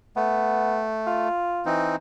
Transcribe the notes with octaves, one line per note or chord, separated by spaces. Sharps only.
A3 B3
F4
E3 C4 D#4